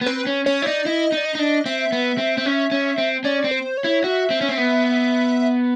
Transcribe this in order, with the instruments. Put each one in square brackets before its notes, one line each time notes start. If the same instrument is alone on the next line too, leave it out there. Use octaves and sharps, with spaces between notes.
[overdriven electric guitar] B3
[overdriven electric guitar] C4 [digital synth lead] B4
[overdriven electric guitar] C#4
[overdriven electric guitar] C#4 [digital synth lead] C#5
[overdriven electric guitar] E4
[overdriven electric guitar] D#4 [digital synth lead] D5
[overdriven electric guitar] E4 [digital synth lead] D#5
[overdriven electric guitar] D#4 [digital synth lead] D5
[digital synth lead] D#5
[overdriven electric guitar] D#4
D4
[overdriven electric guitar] C4 [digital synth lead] E5
[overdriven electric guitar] B3
C4
C4
C#4
C#4
C4
[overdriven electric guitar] C#4 [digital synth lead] D5
[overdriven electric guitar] C4
[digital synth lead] C5
C#5
[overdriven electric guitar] E4
[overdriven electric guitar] F#4 [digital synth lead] E5
[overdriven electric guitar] C4
C#4
C4
B3